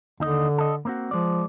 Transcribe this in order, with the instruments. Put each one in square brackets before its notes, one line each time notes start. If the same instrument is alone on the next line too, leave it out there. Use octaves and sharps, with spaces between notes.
[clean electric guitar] D#2 D#4 D#5 [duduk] D3
[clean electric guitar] A4 D#5
A#3 C4 F#4
[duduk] F3 [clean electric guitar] G#3 D5